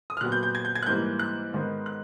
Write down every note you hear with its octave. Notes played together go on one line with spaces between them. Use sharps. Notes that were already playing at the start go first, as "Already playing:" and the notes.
D#6
F6
A#2 F#3 B3 F#6
G6
G6
G#6
G6
G#6
F#6
G#2 E3 G3 A#3 G6
F#6
G#2 D#3 G#3 B3
F#6